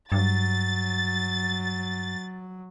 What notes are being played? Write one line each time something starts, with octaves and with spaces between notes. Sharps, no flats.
G2 F#3 A6